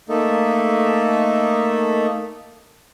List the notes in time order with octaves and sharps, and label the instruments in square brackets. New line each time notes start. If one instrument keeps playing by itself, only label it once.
[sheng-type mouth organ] A3 A#3 D#4 A4